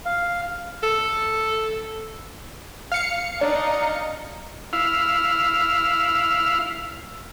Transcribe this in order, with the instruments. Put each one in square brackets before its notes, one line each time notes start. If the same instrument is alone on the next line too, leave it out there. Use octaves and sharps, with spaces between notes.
[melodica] F5
[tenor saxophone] A4
[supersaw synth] F5 C#7
[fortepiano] D4 [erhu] D#4
[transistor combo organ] E4 F5